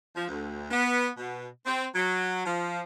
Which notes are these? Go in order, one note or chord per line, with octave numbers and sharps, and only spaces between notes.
F3
D2
B3
B2
C4
F#3
F3